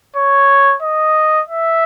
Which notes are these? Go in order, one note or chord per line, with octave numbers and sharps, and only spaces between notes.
C#5
D#5
E5